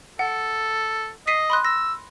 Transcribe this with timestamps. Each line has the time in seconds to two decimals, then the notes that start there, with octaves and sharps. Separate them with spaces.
0.19 A4 F#5
1.27 D#5 B6 C7 D#7
1.50 B5 C6 F#6
1.65 E6 A#6